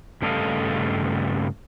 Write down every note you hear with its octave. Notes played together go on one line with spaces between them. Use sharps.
G2 C#3 A3 A4 D#5 F5